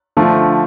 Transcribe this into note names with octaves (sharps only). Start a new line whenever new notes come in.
D3 F3 A3